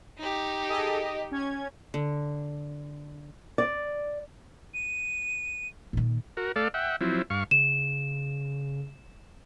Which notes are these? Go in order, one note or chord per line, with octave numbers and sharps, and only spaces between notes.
D#4 G4
G#4 A4 D#5
D#5
C#4 G#6
D3
D5
D#7
A#2 D#3
F#4 A#4
A3 A4 D5 F5
E5 F#5 G5
F3 F#3 C4 E4
G2 F5 C#6
C#3 E7